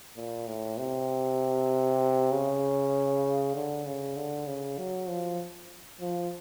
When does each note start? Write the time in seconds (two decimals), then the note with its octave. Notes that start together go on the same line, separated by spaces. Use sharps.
0.17 A#2
0.48 A2
0.79 C3
2.32 C#3
3.55 D3
3.86 C#3
4.16 D3
4.47 C#3
4.78 F#3
5.09 F3
6.01 F3